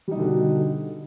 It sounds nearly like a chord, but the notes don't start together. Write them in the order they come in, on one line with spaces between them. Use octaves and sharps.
G3 D#4 B2 D3